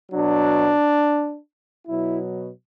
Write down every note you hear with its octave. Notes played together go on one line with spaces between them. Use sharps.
B2 F#3 D4
B2 F#3 E4